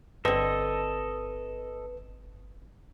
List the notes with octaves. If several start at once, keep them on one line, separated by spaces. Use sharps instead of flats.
G1 D3 C4 A4 B4 D#5